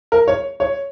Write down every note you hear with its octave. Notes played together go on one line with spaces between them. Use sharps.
A#4
C#5
C#5